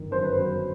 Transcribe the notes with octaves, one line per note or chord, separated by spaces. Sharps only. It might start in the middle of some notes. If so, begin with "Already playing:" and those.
Already playing: G1 D#3
F#2 C5
B4
F#3 C5